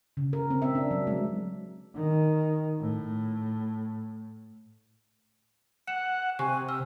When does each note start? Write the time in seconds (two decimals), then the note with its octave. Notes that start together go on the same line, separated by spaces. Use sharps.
0.17 C#3
0.33 A#4
0.50 C4
0.62 E5
0.75 D4
0.91 F#3
1.07 G#3
1.95 D#3
2.80 A2
5.87 F#5 C#7 E7
6.39 C3 G4 G#5 C#6 F#6
6.69 E6 F6